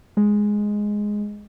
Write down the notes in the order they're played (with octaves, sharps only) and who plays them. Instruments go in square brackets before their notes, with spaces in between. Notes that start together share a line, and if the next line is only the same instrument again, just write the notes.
[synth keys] G#3